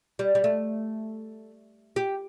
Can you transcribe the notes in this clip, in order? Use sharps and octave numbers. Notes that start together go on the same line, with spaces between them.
G3
G3
A3
G4